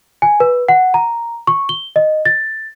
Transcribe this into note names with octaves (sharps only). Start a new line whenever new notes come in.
G#5
B4
F#5
A#5
C#6
G7
D#5
A6